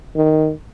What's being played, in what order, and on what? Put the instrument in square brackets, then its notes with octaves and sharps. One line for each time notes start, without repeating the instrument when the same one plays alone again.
[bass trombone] D#3